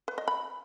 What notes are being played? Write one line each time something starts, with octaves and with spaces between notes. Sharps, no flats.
B4
D#5
B5